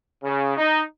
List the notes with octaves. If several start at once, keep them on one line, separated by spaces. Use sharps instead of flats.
C#3
D#4